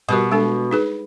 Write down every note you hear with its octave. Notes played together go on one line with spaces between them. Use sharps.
B2 G3 G4 A#4
G#3 D4 A4
D#4 G#4 B4